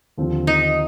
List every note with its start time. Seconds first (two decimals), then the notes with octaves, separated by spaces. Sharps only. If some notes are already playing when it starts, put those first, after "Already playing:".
0.18 D#2 D3 F3 C4 F4
0.47 D#4